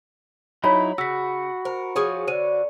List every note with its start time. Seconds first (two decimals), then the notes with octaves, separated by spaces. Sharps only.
0.64 F#3 D#4 E4 C#5 A#5 B5
0.98 C#3 F#4 E6 B6
1.65 A#4 C5
1.96 F3 G#4 C#5 G#5
2.28 D3 C5 D#7